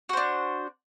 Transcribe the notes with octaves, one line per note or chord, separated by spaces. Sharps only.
D4 F#4 C5